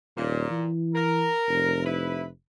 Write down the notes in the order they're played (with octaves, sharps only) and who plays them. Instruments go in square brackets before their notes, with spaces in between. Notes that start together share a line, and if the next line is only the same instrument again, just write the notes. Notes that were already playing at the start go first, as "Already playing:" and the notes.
[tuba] D#1 [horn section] A#2
[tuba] E3
[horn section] A#4
[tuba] F1
[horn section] E4 B4